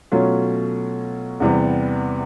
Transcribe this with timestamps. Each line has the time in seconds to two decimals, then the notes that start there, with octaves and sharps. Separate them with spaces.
0.12 B2 F#3 A3 C#4 F4
1.40 E2 C3 E3 G3 B3